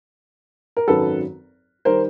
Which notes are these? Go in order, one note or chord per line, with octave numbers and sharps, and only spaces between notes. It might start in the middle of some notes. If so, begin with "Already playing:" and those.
A#4
G#1 F#2 D#3 F#3 A4 B4
D#3 G3 A#4 C5